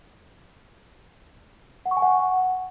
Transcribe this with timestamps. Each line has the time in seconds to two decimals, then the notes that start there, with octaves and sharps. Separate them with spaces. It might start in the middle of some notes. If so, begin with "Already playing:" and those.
1.86 F#5
1.91 C#6
1.97 G#5
2.02 F#5